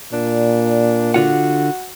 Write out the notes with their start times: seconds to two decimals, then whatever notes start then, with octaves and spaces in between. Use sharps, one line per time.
0.13 A#2 D4
1.14 D3 F4 F#4 F#5